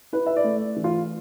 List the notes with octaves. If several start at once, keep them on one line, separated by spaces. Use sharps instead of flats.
E4 B4
E5
D5
A3
E3
F4